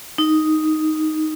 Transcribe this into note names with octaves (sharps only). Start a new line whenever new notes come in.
D#4